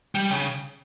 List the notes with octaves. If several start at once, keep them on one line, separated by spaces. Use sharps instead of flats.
G3
C#3